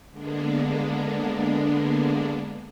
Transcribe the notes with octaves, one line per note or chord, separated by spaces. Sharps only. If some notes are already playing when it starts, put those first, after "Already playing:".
D3 G#3 A#3 B3 D4